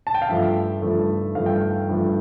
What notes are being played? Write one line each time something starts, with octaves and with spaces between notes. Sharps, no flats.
A5
G5
F5
G2 F3 A3 E5
G2 F3 A3
G2 F3 A3 F5
G5
F5
G2 F3 A3